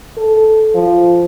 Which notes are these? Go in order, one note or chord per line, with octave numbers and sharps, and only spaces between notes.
A4
F3